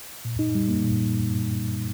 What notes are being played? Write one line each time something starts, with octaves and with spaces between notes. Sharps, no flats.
A#2
D#4
G3
A#3
A#2